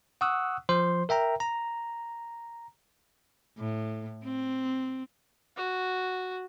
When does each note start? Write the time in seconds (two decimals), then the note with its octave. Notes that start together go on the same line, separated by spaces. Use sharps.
0.21 F#5 C#6 D#6 E6 F#6
0.69 F3 C5 C6
1.09 A#4 E5 G5 A#5
1.40 A#5
3.58 A2
4.23 C4
5.56 F#4